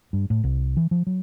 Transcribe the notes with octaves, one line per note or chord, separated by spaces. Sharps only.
G2
A2
C2
E3
F3
F#3